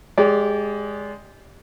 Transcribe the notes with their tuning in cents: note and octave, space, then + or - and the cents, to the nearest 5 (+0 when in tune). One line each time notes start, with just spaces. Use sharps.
G#3 +0 G4 +0 D5 -30